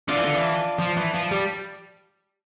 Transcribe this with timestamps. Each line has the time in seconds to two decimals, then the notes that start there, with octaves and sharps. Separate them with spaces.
0.08 D3 D4 F4
0.17 E3
0.25 D3
0.35 E3
0.79 F3
0.96 E3
1.14 F3
1.31 G3